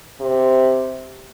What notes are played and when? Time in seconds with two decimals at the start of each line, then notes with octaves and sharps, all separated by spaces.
0.21 C3